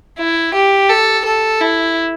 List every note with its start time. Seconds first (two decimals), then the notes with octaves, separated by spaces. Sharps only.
0.18 E4
0.54 G4
0.89 A4
1.25 A4
1.61 E4